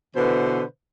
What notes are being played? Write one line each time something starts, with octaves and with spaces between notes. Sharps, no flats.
B2 D3 E3 B4 C5